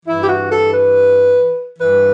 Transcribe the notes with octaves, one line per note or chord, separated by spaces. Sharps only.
G2 E3 E4
G4
F#4
A4
B4
G2 E3 B4